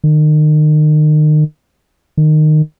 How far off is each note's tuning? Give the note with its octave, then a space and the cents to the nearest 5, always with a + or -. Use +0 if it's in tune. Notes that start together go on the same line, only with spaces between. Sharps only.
D#3 -35
D#3 -20